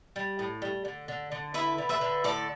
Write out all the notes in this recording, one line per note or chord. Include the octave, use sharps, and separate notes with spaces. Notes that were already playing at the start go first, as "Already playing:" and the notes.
G3
A2
G3
D3
D3
D3
E4 B4 E5
D3
B4 E5
D3
A2 A4 D5